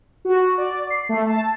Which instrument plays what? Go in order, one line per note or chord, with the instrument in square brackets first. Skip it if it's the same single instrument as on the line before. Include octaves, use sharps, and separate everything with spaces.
[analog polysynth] F#4
D5
C7
A3
A5